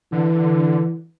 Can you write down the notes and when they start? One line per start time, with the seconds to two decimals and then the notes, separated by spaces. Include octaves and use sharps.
0.12 D3 E3